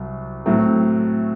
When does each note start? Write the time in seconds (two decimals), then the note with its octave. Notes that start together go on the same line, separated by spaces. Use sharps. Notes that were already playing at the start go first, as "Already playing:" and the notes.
Already playing: C2 F#3
0.46 A2 F#3 A3 C4